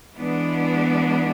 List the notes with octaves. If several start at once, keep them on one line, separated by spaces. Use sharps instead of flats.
E3 G#3 B3 D4